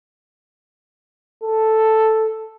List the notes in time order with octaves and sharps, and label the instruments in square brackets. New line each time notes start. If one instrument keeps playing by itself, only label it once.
[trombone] A4